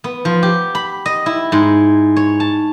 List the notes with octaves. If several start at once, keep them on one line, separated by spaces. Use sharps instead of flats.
B3
F3
G4
B5
D#5
E4
G#2
C#5
A5